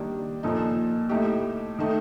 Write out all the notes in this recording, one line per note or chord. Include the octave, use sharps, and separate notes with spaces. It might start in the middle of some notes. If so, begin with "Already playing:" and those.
Already playing: D#3 G3 A#3 D4 G4
A#2 F3 A#3 D#4 A4
A2 A3 D#4 G4
D#3 A3 D#4